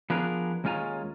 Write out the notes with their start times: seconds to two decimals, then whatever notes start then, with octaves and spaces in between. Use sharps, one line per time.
0.10 F3 B3 D4 G#4 A#4
0.64 D#2 G#3 C#4 F4 G#5 A#5